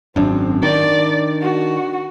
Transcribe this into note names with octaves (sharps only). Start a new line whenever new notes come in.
G#1 F#2 C4 D4
D#3 D5
F#4